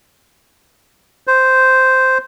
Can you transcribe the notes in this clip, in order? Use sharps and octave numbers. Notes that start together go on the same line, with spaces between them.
C5